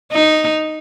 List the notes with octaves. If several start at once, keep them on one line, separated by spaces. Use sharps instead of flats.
D#4